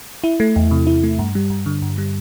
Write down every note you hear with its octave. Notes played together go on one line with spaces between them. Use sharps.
E4
A3
E2
C3
E4
A3
G2
G3
G2
D3
G2
G3